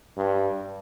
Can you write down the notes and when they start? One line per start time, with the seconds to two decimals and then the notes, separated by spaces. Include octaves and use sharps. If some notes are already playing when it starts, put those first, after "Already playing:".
0.17 G2